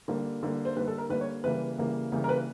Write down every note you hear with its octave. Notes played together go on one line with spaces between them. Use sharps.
D3 G3 A#3
D3 G3 A#3
C5
D3 G3 A#3 B4
A4
A#4
D3 G3 A#3 B4
C#5
C#3 E3 G3 A#3 B4
C#3 E3 G3 A#3
C#3 E3 G3 A#3
A#4
B4